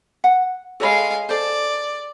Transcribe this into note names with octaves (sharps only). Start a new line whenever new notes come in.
F#5
G#3 A4 C#5 F5 B5
A4 C5 D5